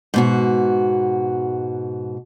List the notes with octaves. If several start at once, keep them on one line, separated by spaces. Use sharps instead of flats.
G#2 B2 F#4